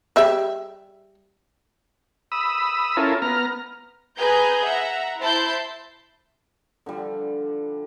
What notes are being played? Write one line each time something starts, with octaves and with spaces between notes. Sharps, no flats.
G3 G#4 E5
B5 D#6 E6
C#4 E4 F4 A4 A#4
B3 A#5 F6
G#4 B4 G#5 A#5 G6
E5 F#5 A#5
E4 C5 A5 B5 C6 G6
D3 F3 G3